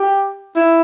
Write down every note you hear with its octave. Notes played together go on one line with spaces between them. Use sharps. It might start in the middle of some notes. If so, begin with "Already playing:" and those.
Already playing: G4
E4